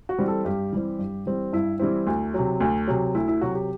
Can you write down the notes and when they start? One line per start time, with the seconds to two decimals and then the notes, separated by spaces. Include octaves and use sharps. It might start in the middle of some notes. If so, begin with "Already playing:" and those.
0.09 F#4
0.19 E3 G3 C4
0.28 A4
0.45 G2 G4
0.73 E3 G3 C4
0.99 G2
1.26 E3 G3 C4
1.53 G2 E4
1.80 E3 G3 C4 E4
2.07 D2
2.34 C3 F#3
2.60 D2
2.88 C3 F#3
3.15 D2 E4
3.28 E4
3.41 C3 F#3 F#4
3.55 G4